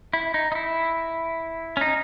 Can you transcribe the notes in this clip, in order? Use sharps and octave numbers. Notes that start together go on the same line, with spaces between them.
E4
D#4
D#4
E4
C#4
D#4